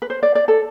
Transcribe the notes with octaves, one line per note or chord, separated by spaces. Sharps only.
B4
C5
D5
D5
A4